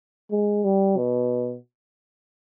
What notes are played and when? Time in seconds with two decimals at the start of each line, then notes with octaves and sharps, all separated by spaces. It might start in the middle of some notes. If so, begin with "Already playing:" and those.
0.31 G#3
0.64 G3
0.97 B2